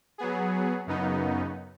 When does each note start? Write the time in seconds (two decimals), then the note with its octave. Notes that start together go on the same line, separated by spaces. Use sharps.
0.18 F#3 B3 G#4
0.87 F#2 C#3 B3 D#4